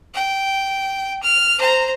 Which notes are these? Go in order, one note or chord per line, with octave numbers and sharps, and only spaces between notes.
G5
F6
C5 A#5